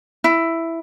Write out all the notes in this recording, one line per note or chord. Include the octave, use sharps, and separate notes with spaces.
E4